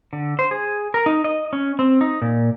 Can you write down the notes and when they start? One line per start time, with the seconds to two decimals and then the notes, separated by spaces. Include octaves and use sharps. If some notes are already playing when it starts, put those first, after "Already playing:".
0.13 D3
0.39 C5
0.51 G#4
0.94 A#4
1.06 D#4
1.24 D#5
1.53 C#4
1.79 C4
2.01 D#4
2.22 A#2